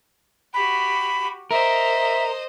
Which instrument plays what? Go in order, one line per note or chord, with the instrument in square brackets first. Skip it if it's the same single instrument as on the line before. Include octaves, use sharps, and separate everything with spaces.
[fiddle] F#4 G4 [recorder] B5
[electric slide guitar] A#4 [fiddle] C5 D#5 [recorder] E5